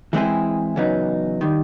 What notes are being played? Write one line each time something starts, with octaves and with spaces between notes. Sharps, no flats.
E3 G#3 C4 E4 G#4
E2 C#3 F#3 B3 D#4
D#3 G3